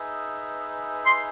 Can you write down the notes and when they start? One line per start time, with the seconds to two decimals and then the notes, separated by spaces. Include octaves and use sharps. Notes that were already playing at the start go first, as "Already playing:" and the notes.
Already playing: D#4 G#4 B4 E5
1.06 C6